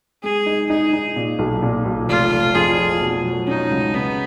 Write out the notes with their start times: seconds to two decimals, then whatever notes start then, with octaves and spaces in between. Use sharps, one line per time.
0.23 G#3 G#4
0.46 D#4
0.69 D#4 G#4
0.93 D#4
1.16 A#2
1.39 B1
1.63 A#2
1.86 B1
2.09 F1 F4
2.32 F1
2.55 F2 G#4
2.78 F3
3.01 B2
3.24 F#3
3.47 C#4 D#4
3.70 C#2
3.94 C#3 B3